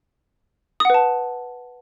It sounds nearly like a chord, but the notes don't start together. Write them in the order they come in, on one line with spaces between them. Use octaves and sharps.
D#6 F#5 B4 A5